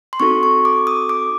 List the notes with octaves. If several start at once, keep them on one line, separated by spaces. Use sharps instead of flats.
C6
C4 D#4 F#4 A4 C#6
C#6
D6
D#6
D6